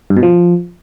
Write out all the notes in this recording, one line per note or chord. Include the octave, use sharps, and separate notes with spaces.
G2
B2
F3